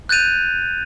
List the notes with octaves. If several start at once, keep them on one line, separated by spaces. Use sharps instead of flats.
F#6 G6 A6 D#7 F7